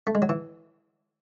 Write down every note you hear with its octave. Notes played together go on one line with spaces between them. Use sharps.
A3
G#3
F#3
E3